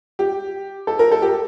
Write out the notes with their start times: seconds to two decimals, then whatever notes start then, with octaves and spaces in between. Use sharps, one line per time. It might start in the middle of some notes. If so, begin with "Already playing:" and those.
0.19 G4
0.87 A4
0.99 A#4
1.12 A4
1.22 G4